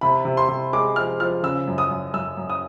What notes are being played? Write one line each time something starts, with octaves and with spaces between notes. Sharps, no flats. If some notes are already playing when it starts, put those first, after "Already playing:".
C3 B5
C3
C6
C3
G#3 D6
F3 F6
F3 F6
C#3 E6
F#2
D#6
F#2
F#2 E6
F#2
D#6